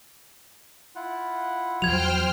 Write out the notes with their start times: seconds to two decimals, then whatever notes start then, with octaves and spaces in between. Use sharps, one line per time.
0.95 E4 F4 F#5
1.82 E2 F3 F#3 C5 G5 F6 G#6 F7